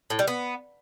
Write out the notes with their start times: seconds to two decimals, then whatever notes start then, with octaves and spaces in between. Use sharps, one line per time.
0.10 A2
0.19 G3
0.27 B3